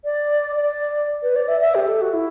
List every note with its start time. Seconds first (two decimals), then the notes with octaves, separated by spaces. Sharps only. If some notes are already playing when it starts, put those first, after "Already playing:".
0.05 D5
0.56 D5
1.23 B4
1.36 D5
1.48 E5
1.61 E5
1.75 G4
1.88 A4
2.01 F#4
2.13 E4